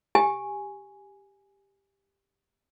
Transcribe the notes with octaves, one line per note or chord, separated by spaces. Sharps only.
G4 G#5